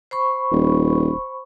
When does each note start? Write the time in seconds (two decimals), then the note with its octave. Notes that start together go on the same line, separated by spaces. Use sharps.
0.11 C5 B5 C#6
0.51 D#1